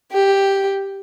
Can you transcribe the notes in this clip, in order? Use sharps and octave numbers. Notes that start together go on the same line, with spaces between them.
G4